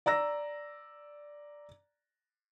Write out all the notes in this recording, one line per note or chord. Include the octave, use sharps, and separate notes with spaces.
D5 A#5 E6 A#6